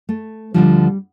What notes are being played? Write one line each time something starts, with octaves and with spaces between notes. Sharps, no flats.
A3
D2 D3 F3 G3